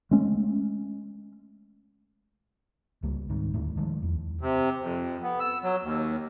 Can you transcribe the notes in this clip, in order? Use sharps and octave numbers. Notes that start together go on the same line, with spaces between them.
G#3 A3 C#4
C#2 G3 A#3
G#2 D#3
D1 D#2 A2
D#3 F3 G#3 A3
E2
C3
F2
B3
E6
F#3
D#2